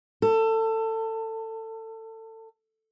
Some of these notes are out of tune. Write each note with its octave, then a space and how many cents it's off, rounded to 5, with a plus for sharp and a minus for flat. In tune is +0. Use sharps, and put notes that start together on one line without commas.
A4 +25